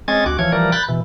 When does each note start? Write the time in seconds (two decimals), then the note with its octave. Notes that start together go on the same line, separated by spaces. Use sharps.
0.08 G#3 C4 C#4 D#5 G#6 A6
0.26 D2 F#4 D6
0.39 E3 F3 C#5 G#6
0.52 E3 F3 G3 A#4 D5
0.72 B5 F#6 G6 A6
0.88 B2 E3